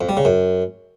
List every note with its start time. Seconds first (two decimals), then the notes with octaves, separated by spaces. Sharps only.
0.01 F2
0.09 G3
0.17 C#3
0.25 F#2